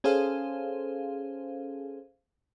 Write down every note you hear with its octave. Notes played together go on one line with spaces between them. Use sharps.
C#4 G#4 A4 C5 F5